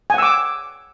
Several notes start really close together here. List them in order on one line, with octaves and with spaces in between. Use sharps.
G#5 F#5 E6 D6